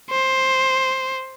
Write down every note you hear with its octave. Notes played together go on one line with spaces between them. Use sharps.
C5